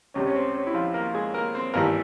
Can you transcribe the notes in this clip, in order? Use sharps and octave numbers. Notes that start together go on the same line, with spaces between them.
C#2 C3 G3 C#4
C#4
C4
C#4
E4
F3 F4
A#3 A#4
G#3 G#4
A#3 A#4
C4 C5
G#1 G2 E3 G3 A#3 A#4